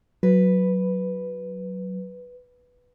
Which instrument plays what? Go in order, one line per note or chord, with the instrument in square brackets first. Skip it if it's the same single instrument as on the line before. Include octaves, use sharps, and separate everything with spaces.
[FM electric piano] F#3 [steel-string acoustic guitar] B4